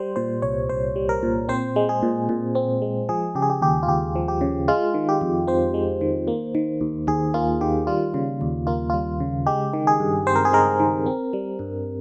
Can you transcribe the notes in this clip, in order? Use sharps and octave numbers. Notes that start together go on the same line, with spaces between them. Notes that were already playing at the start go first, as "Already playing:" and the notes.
Already playing: G3 C5
A#2 C5
C2 C#5
C2 C5
G3
A#4
A#2
C4 C5
G#3
G#4
A#2
A#2
C4
G#3
F3 G#4
C#3 G4
G#4
G4
D#2 G4
F4
D#2 G4
F3
G4
C#3
G#3 F4
D#3
G4
F2
C4 C5
G#3
D#3
A#3
D#3
D#2
D#2 G#4
A#3 F4
D#3 G4
G3 F4
C#3
D#2
A#3 F4
G3 F4
C#3
G#3 G4
D#3
G#4
G2
C4 C5
A#4
G#4
G#3 A#4
D#3
C4
G3
G2